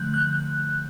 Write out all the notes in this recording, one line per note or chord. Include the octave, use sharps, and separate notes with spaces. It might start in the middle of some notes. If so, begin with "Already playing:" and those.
Already playing: D3 F3 A3 F#6 G6
F#6